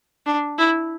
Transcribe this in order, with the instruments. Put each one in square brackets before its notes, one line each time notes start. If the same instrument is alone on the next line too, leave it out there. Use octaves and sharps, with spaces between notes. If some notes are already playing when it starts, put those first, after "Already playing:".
[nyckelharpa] D4
E4